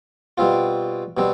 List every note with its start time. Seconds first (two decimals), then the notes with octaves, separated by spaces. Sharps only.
0.38 B2 G3 C4 F4
1.17 B2 G3 C4